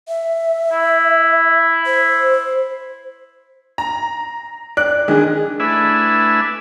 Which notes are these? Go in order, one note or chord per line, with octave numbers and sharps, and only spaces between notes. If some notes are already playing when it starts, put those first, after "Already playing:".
E5
E4
C5
A#5
D5 F#6
D#3 G#3 D4 G#4
A3 D4 E4 B4 E5 G#5